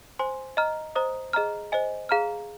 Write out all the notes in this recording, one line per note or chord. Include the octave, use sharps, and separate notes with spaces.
C5 G#5 C6
D#5 A#5 F6
C5 D#5 A#5 D#6
G#4 D#5 A#5 F6
C5 D#5 G#5
G#4 F5 A#5 F6